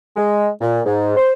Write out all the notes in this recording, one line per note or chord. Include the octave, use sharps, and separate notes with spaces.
G#3
A#2
G#2
C5